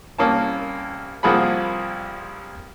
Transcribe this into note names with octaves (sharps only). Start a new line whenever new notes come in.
C2 A#3 C#4 A5
C2 F3 A#3 G#4 F#5 B5